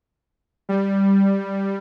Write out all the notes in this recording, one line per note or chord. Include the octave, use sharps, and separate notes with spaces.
G3